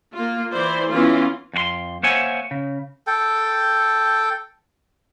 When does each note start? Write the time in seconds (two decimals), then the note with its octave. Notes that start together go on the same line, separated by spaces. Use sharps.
0.14 A#3 F4
0.51 E3 E4 C5 D5
0.90 E3 B3 C#4 F4
1.53 F2 F#4 C6
2.03 A#3 C5 C#5 E5 F#5 G#5
2.51 C#3
3.07 A4 G5